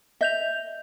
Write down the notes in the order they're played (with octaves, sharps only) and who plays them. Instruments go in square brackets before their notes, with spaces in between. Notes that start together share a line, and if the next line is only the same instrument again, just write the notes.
[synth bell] D#5 G6 F7 [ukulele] E5